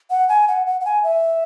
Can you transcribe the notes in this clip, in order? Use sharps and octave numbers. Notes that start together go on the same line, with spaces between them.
F#5
G#5
F#5
F#5
F#5
G#5
E5